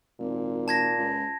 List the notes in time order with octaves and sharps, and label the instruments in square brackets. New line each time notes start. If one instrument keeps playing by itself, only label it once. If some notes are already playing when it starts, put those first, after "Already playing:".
[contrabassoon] G#1 [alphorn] A#2
[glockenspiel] A5 G#6 A#6
[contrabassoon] C#2